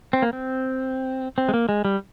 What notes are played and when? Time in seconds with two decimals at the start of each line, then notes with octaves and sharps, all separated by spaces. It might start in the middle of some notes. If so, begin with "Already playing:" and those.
0.13 C4
0.22 A#3
0.33 C4
1.38 C4
1.49 G#3
1.54 A#3
1.69 G#3
1.85 G3